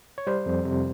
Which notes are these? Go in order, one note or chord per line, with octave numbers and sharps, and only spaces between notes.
C#5
G3 C5
F2
C3